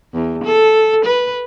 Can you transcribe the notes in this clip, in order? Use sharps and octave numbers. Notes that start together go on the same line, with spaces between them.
E2
A4
B4